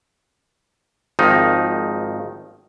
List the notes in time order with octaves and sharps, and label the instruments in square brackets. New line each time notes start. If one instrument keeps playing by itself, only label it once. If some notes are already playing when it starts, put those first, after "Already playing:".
[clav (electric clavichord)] G#1 D#3 F3 D#4